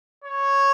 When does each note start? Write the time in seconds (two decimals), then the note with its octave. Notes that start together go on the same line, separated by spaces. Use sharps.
0.24 C#5